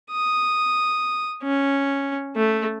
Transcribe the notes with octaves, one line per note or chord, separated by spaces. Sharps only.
D#6
C#4
A3